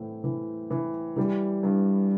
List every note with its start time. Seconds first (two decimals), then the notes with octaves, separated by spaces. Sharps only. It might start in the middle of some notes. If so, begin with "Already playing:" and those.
Already playing: A2 E3 C4
0.24 E3
0.70 E3
1.16 E3 G3
1.63 G2